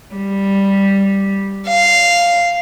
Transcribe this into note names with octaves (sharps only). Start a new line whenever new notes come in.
G3
F5